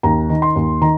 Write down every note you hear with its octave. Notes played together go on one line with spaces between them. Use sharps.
D#2 A#5
D#3
C6
D#2
D#3 A#5